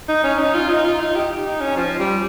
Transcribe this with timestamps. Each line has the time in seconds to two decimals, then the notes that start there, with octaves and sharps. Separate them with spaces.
0.08 D#4
0.24 C#4
0.39 D#4
0.54 F4
0.69 D#4
0.85 F4
1.00 D#4
1.15 G4
1.45 D#4
1.60 C#4
1.76 F3
1.99 G3